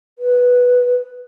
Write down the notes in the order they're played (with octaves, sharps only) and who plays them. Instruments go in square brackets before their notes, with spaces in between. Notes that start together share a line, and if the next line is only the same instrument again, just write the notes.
[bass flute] B4